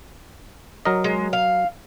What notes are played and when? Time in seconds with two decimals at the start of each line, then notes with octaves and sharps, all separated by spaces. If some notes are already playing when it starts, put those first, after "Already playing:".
0.85 F#3 A#4 D#5
1.04 G#3
1.33 F5